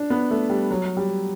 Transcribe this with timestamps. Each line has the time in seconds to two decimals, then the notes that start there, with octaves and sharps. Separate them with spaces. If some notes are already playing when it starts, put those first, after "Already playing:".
Already playing: D4
0.10 B3
0.31 A3
0.50 G3
0.71 F#3
0.97 G3